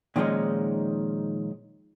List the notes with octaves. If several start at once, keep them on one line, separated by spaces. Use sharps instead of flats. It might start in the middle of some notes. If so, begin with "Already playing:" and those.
A#2 D#3 F3 G#3 C#4 D#4